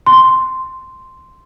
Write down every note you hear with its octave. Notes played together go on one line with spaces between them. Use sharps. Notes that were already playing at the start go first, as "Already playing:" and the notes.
C6